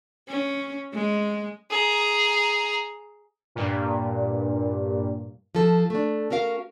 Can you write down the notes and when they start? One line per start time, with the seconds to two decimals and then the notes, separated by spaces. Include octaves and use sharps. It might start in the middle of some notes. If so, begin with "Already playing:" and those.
0.28 C#4
0.93 G#3
1.71 G#4 A#5
3.55 G2 A#2
5.55 F3 A4
5.90 A3 D4
6.30 C#4 F#4 A#4 F5